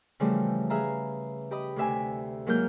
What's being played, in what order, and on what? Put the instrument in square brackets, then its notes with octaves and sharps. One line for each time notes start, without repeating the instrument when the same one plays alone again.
[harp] C#3 E3 F3 G3 A3
G#4 B4 E5 F5 G#5 A#5
G4 D#5 B5 D#6
D2 C3 E5 G#5
G#2 F#3 A#3 A#4 F6 G6